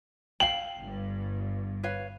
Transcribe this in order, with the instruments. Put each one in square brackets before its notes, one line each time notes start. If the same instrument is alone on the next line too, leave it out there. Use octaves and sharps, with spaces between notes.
[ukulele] F5 G5 [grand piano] F#7
[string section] G1 G2
[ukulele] B4 C#5 F5